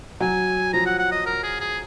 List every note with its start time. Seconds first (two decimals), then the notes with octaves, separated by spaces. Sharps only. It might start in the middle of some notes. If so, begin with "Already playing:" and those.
0.20 F#3 G#5
0.73 F3 A#5
0.86 F#5
0.99 F#5
1.12 D#5
1.26 A#4
1.43 G#4
1.60 G#4